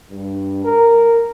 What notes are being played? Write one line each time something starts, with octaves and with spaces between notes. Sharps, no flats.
G2
A#4